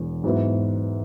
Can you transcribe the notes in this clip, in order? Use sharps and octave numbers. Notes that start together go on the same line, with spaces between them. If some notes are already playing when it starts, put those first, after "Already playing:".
Already playing: E1 E2
G#2 F#3 B3 E4 B4